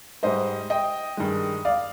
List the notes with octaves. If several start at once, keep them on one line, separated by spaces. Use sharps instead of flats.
G#2 G3 C5 D#5
D#5 G5
G2 D#3 G#3
D5 F5